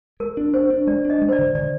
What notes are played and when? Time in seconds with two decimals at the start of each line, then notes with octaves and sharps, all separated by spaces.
0.20 G#3 A#4
0.37 D4
0.54 D4 C5
0.70 D4
0.87 G#3 D5
1.05 D4
1.10 D#5
1.22 G#3
1.29 C5
1.32 D5
1.38 D3
1.55 D3 D5